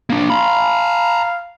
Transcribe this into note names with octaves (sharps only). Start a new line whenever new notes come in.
A#3 D4
F5 A#5 B5